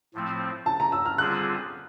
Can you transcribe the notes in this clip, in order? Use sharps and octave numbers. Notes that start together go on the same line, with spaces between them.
A2 F3 A3 C4
A5
A#5
E6
F6
D3 G3 C4 F4 G#4 F#6